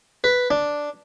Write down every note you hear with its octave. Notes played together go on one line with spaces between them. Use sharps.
B4
D4